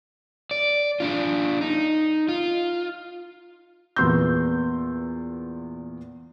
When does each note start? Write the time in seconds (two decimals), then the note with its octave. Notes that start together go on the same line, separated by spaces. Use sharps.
0.51 D5
1.00 D4 F4
1.61 D#4
2.28 F4
3.96 E2 A#2 B3 C6 E6 G6